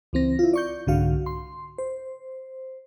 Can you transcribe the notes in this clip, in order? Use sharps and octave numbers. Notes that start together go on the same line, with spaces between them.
C#2 E3 C4 A#6
E4 F4
D5 C#6 G6
C2 G#2 D3 F#4 F5
C6
C5